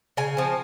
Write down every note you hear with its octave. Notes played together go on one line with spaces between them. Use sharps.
C#3 G#5
F3 C4